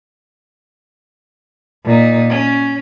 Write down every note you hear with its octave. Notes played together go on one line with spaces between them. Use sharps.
A#2 D#4
C#4